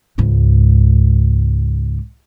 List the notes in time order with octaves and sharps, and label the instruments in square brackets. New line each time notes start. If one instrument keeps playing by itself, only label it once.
[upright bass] C#2 G#2